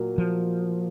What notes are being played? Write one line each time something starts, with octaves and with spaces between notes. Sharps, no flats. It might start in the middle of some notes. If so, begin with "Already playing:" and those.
Already playing: A#2 F#3 A#3
F3